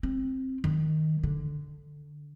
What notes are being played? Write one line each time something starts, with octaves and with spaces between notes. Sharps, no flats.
C4
D#3
D3